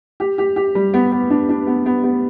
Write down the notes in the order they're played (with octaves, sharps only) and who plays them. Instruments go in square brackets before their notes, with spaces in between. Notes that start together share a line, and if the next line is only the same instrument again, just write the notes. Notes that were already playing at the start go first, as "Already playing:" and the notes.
[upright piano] G4
G4
G4
G3
B3
B3
D4
D4
B3
B3
B3